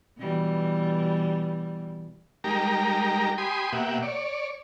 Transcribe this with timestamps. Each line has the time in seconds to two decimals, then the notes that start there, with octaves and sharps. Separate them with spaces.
0.17 B2 E3 G3
2.44 G3 G#3 D#4 G4 A#4 A#5
3.38 G4 G#5 B5 C6 D#6
3.72 B2 A#3 G4 E5 F#5
4.02 C#5 D5